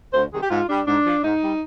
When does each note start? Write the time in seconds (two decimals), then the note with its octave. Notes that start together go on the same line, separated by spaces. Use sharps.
0.14 D2 C5
0.33 C3 D#3 G3 G#4
0.41 G4
0.50 G#2 F4
0.69 G3 D4
0.87 G#2 D4
1.05 F3
1.24 G#2 D#4
1.42 G3